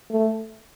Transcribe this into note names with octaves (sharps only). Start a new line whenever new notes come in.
A3